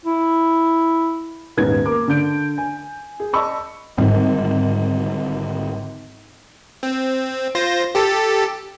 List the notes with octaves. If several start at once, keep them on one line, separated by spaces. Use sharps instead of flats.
E4
D#1 G#2 B3 C#4 D#4 G#6
A#3 D6
D3 D4 G6 D7
G#5
G#4
D5 D#5 A5 B5 C#6 E6
G#1 D3 G3 C4
C4
F4 C5 A#6
G4 A4 A5